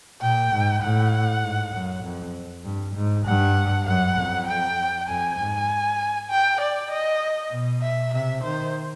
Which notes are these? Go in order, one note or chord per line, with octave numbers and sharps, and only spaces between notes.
A#2 G5
G#2
A2 F#5
G#2
F#2
F2
G2
G#2
G2 F#5
F#2 F#5
F2
G5
F2 G#5
G#2
G5
D5
D#5
B2
E5
C3 E5
D#3 C5